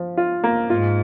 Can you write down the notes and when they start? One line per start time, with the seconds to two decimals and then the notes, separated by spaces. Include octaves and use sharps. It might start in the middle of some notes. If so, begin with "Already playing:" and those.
Already playing: F3
0.17 F4
0.44 A#3
0.70 G#2 F4